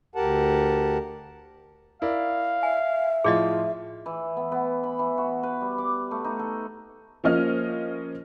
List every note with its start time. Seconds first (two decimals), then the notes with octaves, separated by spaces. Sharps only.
0.15 D2 G4 A#4 F#5 A5
2.02 E4 A#4 D5 F5
2.63 E5 G#5
3.24 A2 F3 F4 G#4 D5 D#5
4.06 E3
4.37 B3
4.52 B3
4.83 B5
4.99 E3
5.18 F#4
5.43 B4
5.61 G3
5.78 D6
6.11 A3
6.24 D#4
6.39 A4
7.24 F3 A#3 C#4 D#5 F6